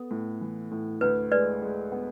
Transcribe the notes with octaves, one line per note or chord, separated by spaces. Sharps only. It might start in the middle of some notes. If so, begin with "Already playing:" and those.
Already playing: B3 A4
A2
E3
A2
D2 B4
G#3 B4 D5
G#3
B3